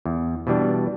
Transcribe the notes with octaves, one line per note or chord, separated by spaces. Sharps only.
E2
B2 E3 G3 D4